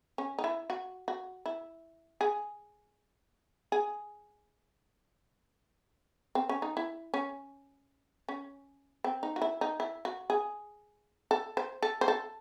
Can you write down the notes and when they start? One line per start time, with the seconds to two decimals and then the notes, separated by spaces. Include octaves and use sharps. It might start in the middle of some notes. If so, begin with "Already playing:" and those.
0.18 C#4
0.39 D#4
0.44 E4
0.70 F#4
1.08 F#4
1.46 E4
2.21 G#4
3.72 G#4
6.35 C4
6.49 C#4
6.62 D#4
6.77 E4
7.14 C#4
8.29 C#4
9.04 C4
9.23 D#4
9.36 F#4
9.42 E4
9.61 D#4
9.80 E4
10.05 F#4
10.30 G#4
11.31 A4
11.57 C5
11.83 A4
12.01 C5
12.08 A4